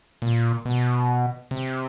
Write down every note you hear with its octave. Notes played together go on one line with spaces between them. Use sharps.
A#2
B2
C3